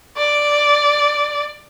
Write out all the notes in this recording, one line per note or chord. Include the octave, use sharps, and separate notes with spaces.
D5